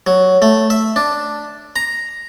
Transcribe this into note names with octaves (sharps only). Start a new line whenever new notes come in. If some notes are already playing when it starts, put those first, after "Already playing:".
F#3
A3
E5
D4
A#5